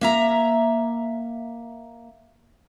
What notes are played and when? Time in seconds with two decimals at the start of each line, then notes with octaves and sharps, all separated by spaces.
0.01 A#3 E5 A#5